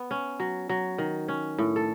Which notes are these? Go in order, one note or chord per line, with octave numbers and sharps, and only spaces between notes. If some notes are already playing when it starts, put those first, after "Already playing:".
Already playing: B3
C#4
F#3
F#3
D#3
C#4
A2
A4